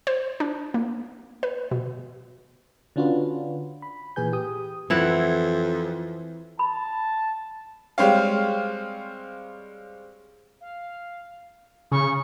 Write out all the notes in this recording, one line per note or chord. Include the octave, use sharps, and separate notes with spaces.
C5
D4
A#3
B4
B2
D3 C#4 D4 F4 F#4 B4
B5
A#2 E3 G#4 B4 G#5 G6
G4 D#6
F2 E3 E4 F#5
A5 B5
G3 G#3 C4 C#5 F5
F5
C#3 C#6